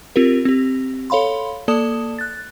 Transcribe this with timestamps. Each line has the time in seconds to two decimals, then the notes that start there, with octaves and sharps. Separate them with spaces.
0.16 C4 F4 G4 A#4
0.45 C4 G4
1.10 A4 C#5 F5 B5 C6
1.68 A#3 A4 D5 A5 D#6 E7
2.19 F#6 A6